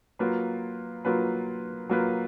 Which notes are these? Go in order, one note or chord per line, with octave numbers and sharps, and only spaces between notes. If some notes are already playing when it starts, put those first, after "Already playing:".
F#3 A#3 F4 B4
F#3 A#3 F4 B4
F#3 A#3 F4 B4